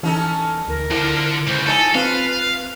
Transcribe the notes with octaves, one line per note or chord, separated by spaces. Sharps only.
E3 C#4 D#4 A4
D2 A#4
D3 F3 E4
C#2 C5
F3 D#4 A4 C#5 G#5
C4 F4 B4 F5